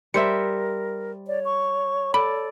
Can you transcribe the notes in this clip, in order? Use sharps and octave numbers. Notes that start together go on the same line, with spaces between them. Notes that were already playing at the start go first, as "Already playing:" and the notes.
G3 A#4 C5 E5 C#7
C#5 D5
C#6
A4 D5 B5